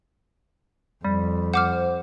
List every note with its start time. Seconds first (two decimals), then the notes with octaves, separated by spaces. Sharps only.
1.04 F2 G3
1.54 C5 F#5 D6 F6